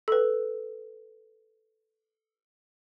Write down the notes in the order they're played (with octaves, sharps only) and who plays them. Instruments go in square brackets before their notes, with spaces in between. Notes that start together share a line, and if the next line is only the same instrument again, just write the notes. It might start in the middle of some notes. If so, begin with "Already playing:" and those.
[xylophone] A4 B4